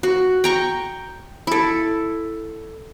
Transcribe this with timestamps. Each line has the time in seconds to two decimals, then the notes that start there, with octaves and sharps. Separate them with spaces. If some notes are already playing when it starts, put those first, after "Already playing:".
0.03 F#4
0.44 G5 A#5 C#6
1.47 E4 A4